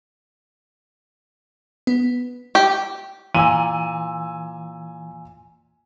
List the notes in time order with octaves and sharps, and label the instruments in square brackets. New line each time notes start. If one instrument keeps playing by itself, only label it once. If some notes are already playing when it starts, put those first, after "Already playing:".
[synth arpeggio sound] B3
[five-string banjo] G4
[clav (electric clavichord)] A#2 [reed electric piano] E3 [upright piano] G#5 E6 D#7